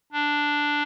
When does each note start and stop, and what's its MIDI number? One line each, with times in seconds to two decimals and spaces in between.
0.12 0.83 62